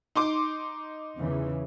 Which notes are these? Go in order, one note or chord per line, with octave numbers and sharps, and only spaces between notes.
D#4 C6 D6
E2 C#3 E3